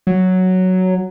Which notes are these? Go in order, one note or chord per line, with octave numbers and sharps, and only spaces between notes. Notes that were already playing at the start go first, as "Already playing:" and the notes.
F#3